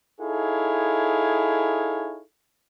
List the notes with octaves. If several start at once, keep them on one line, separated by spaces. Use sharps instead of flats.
D#4 E4 G#4 A4 C#5 F5